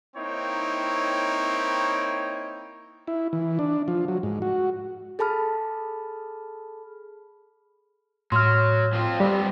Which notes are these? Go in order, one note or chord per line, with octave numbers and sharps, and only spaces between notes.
A#3 C4 D#4 E4 C#5 G5
E4
E3
D4
F3
F#3
G#2
F#4
G#4 A4 A5 B5 F6
A2 F#3 C6 F6
F3 C4 F4
G3 B3 C4 G4